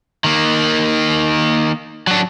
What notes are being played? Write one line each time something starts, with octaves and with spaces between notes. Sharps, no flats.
D#3 A#3
F#3 D4